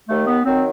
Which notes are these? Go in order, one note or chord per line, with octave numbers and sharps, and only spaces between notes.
D#2 A3
B3
D#3 F#3 C4